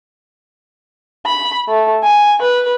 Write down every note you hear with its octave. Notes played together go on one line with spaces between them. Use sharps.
B5
A3
G#5
B4